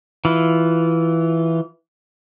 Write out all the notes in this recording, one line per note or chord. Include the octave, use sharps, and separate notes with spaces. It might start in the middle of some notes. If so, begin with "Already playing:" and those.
E3 F4